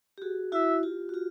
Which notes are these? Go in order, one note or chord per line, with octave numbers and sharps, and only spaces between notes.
G4
F#4 G#4
E4 F#4 E5
F4 G4
F#4
F4 G4